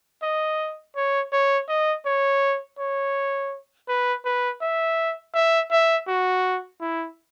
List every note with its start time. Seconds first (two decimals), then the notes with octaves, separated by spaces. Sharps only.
0.22 D#5
0.96 C#5
1.33 C#5
1.69 D#5
2.06 C#5
2.79 C#5
3.88 B4
4.25 B4
4.61 E5
5.35 E5
5.71 E5
6.08 F#4
6.81 E4